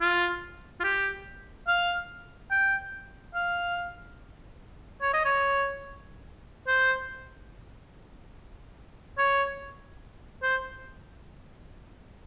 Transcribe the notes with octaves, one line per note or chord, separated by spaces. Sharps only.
F4
F4
G4
F5
G5
F5
C#5
D#5
C#5
C5
C#5
C5